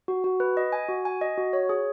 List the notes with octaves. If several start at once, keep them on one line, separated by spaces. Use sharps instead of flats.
F#4
F#4
B4
D#5
G#5
F#4
G#5
D#5
F#4
C#5
G#4